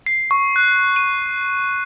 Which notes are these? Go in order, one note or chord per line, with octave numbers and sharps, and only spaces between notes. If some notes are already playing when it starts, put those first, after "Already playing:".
C7
C#6
F#6
D#7